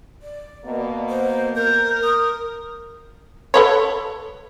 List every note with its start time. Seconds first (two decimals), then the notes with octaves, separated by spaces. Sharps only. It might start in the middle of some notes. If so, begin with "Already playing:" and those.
0.22 D5
0.65 B2 A#3
1.09 C5
1.55 A#4 G6
2.03 D#6
3.54 A4 B4 C#5